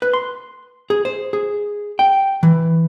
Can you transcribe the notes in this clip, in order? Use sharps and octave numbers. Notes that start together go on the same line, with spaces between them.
B4
C6
G#4
C5
G#4
G5
E3